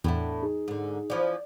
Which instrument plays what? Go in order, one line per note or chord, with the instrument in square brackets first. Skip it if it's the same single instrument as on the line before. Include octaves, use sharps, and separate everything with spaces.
[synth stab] E2 [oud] A2 D4 E4 [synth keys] F#5 G5
[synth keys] D#4 G#4
[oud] G#2 D3
[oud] E3 F3 C#4 [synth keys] D5